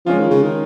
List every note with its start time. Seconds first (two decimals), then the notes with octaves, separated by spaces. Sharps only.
0.06 F3 G#3 C#4 F4
0.19 D#3
0.30 C#3
0.43 D#3